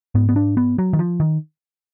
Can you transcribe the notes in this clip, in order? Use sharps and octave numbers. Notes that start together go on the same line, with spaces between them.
G#2 B3
B3
D4
B3
F#3
D#3
F3
D#3